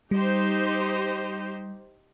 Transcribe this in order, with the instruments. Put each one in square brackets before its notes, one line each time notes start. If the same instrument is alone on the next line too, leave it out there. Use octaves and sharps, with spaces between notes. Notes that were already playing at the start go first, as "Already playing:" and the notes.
[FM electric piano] G3 [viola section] D#4 G4 C5